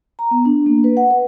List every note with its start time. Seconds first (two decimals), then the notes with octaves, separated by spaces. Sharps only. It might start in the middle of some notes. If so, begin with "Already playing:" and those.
0.19 A#5
0.31 B3
0.45 D4
0.66 A#3
0.84 B4
0.97 F#5
1.10 B4